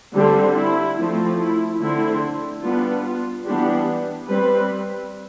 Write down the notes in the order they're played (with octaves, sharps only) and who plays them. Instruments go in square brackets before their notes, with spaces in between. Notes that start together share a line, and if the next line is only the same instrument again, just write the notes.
[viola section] D3 G3 C4 G4
E4
F3 A3 C4
E4
D3 A3 C4 E4
G3 B3 D4 F4
F4
E3 G3 B3 D4 G4
G3 C4 B4